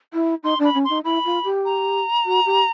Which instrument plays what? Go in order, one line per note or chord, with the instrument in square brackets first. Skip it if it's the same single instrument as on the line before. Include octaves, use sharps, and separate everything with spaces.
[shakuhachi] E4
[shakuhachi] D#4 [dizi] C6
[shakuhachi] D4
[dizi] B5
[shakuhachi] C#4
[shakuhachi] D#4 [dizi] C6
[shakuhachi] E4 [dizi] B5
[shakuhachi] F4
G4
[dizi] A#5
[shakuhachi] F#4
G4